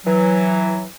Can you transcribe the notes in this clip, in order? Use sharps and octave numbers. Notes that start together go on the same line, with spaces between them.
E3 F#3